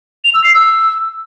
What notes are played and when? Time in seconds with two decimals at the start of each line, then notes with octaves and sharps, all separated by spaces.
0.24 F7
0.34 E6
0.44 C7
0.54 E6